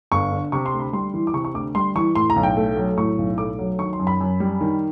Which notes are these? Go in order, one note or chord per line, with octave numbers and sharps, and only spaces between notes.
G1 C#6
D3
C3 C#6
C6
D2
B5
G3 C6
E3
D6
C3 C#6
C#6
D2 D6
G3 C6
E3 C#6
A2 C6
A#5
B1
G5
A3
F#3
A2 C#6
B1
A3 D6
F#3
D#3 C#6
C6
F#2
B5
F#2
G3
D#3